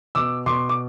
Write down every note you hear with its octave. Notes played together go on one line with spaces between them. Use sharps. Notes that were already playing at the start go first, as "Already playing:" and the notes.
B2 D6 E6
B2 C6 D6
D6